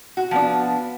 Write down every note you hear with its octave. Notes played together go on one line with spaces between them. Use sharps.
F#4
F3 B3 D4